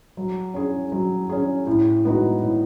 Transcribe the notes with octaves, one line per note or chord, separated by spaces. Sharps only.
F#3
C#4 G#4
F#3
C#4 G#4
A2
G#3 B3 D#4 F#4
A2